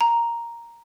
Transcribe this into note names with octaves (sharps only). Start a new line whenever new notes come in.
A#5